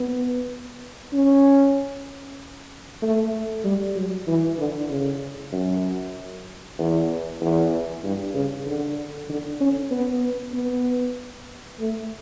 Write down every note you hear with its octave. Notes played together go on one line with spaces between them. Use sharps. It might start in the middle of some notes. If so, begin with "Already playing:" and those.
Already playing: B3
C#4
A3
G3
F#3
E3
D3
C#3
F#2
E2
E2
G2
C#3
D3
D3
C#4
B3
B3
A3